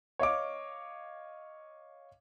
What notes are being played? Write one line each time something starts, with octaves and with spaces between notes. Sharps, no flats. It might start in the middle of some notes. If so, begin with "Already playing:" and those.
C#5 D#5 F5 D6